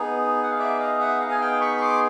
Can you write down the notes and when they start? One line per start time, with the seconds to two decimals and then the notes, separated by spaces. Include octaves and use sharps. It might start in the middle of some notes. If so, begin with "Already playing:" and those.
Already playing: B3 D#4 G#4
0.43 F#5
0.51 F5
0.59 D5 E5
0.79 D#5 F5
1.00 E5 F#5
1.20 D#5 F5
1.31 G#5
1.41 F5 G5
1.61 B5 C#6
1.77 C#6
1.82 C6 D6